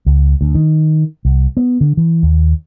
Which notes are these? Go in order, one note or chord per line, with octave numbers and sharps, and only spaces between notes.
C#2
D2
D#3
C2
B3
D3
E3
D#2